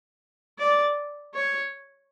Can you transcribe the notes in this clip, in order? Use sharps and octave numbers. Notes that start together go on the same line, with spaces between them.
D5
C#5